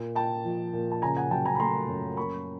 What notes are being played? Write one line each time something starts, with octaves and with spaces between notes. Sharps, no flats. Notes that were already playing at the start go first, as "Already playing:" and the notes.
Already playing: A#2
A#2 G5 A5
F3
A#2
A5
C#3 G#5 A#5
F#5 G#5
F#3 G5 A5
G#5 A#5
B5
A3 A#5 C6
F#2
A#3 B5 C#6